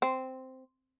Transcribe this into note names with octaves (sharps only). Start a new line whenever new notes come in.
C4